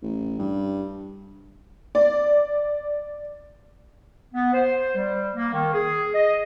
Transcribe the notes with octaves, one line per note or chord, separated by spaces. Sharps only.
A1
G2
D5
B3
C5
G3
A#3
D#3
G#4
D#5